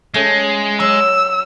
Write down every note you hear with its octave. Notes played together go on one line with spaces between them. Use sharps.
G#3 A3 C#4
F#3 E6